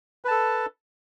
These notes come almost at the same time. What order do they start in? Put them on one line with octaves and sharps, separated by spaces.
B4 A5 A4